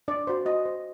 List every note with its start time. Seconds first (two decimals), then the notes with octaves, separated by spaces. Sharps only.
0.08 D4 D5
0.27 F#4 C5
0.46 F#4 D#5
0.66 C5